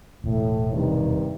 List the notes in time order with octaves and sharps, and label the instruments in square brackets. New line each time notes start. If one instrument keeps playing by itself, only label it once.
[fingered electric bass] E1 [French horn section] A2
[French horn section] G2 C3 D#3